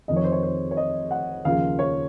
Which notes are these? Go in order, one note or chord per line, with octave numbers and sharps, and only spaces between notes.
F1 F2 D#3 D#5
C#5
C5
C#5
C5
C#5
D#5
F#5
D#2 C#3 F3 F5
C#5